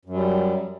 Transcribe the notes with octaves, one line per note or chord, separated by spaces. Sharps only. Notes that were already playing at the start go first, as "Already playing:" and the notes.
F#2 F#3 G3